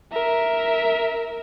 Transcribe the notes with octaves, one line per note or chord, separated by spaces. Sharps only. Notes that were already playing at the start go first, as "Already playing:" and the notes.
A#4 E5